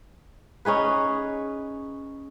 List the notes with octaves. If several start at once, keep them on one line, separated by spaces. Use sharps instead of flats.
C#4 D#4 G#4 B4